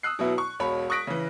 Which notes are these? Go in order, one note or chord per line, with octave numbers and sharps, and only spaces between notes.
D#6 E6 F#6 C7
B2 F#3 B3 E4
C#6
E1 B1 C#5 B5
C#6 D#6 F#6 A#6 B6 D7
C#3 E3